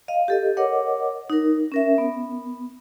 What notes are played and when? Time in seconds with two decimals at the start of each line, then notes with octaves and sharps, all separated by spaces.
0.08 D#5 F5
0.28 G4 A4 D#5
0.57 A#4 C#5 D#5 F#5 D6
1.30 D#4 A#4
1.72 C#4 A#4 E5
1.98 B3